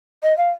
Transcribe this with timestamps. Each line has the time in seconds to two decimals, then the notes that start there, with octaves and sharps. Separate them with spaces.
0.23 D#5
0.37 F5